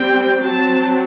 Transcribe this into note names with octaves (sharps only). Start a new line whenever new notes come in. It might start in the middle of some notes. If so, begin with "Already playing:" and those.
Already playing: G3 C4 G5
F#3 C4 A5